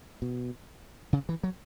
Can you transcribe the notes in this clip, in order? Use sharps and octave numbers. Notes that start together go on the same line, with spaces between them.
B2
C#3
E3
F#3